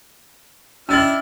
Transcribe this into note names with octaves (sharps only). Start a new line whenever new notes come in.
C#4 D4 E4 D#5 E6 F6 A6 F#7